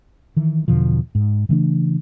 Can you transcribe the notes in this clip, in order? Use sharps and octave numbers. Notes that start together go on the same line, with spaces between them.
D#3 E3
E2 B2 D3 F3
G#2
C#3 E3 A3 D4